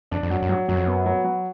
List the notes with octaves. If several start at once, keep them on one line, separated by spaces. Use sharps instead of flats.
F2 D4
F2
F#2 F#3
F#2
G2 F#3
F#2 F#3
F2
F#2 B3
F#3
F#3